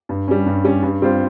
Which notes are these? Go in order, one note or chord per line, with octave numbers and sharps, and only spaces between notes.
G2
G3 C#4
G2
G3 C#4
G2
G3 C4 F4 C5